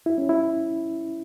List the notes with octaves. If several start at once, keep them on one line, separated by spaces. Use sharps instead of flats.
E4
C#4
E4